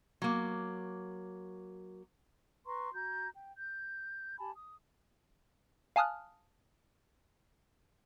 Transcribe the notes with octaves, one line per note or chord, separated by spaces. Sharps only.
F#3 A#3
B4 A#5 C6 C#6
F#4 A#5 G6
G5
G6
G4 G#5 A5 B5
D#6
F5 G#5 A5 D#6 F6 F#6